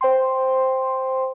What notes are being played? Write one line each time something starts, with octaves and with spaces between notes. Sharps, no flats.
C5 G5 C6